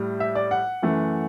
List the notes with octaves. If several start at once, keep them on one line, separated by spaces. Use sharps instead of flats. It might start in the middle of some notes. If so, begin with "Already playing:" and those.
Already playing: A2 G3
E5
D5
F#5
F#2 E3 A3